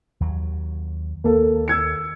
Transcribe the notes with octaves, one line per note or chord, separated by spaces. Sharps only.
D#2 F#3
D#2 A#3 A4
E6 G#6 C#7